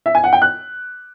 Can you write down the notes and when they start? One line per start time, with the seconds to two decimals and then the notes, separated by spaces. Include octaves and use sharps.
0.06 E5
0.15 G#5
0.24 F#5
0.33 G5
0.42 F#6